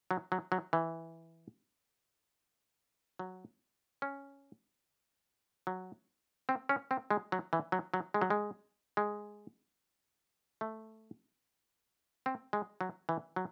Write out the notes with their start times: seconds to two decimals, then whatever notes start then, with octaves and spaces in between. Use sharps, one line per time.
0.11 F#3
0.32 F#3
0.52 F#3
0.73 E3
3.19 F#3
4.02 C#4
5.67 F#3
6.49 C4
6.69 C#4
6.91 C4
7.11 G#3
7.32 F#3
7.53 E3
7.72 F#3
7.94 F#3
8.14 G#3
8.21 F#3
8.30 G#3
8.97 G#3
10.61 A3
12.26 C4
12.53 G#3
12.81 F#3
13.09 E3
13.36 F#3